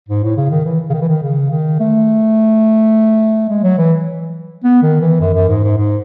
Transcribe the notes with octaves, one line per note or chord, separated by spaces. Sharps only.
G#2
A2
C#3
D#3
E3
C#3
D#3
E3
D#3
C#3
D#3
A3
G#3
F#3
E3
B3
D#3
E3
F#2
F#2
G#2
G#2
G#2